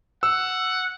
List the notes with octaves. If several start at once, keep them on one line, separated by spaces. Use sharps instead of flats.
F#5 E6